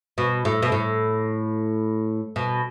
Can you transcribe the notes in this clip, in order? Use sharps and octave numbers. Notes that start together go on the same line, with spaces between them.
B2
A2
B2
A2
B2